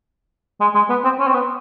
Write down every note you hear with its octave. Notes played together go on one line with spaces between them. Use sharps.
G#3
G#3
B3
C4
C#4
C4
B3